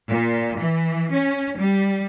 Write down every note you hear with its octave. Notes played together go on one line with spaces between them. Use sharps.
A#2
E3
C#4
G3